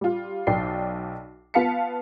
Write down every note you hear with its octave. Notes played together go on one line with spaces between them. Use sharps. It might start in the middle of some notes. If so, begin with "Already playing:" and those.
G3 F4
B1 D5 G5 C7
B3 F4 F5 A5 B6 C#7